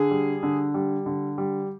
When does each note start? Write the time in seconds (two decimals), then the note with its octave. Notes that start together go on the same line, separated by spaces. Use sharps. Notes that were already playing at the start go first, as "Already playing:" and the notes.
Already playing: D3 G#4
0.11 G3
0.43 D3
0.74 G3
1.06 D3
1.38 G3